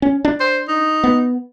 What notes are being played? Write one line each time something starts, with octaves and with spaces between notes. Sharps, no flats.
C#4
D4
C5
D#4
B3